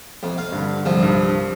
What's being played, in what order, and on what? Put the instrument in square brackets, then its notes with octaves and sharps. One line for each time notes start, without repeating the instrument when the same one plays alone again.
[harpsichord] F2
F5
[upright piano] G2 D3
[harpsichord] C2 F3
[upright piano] G2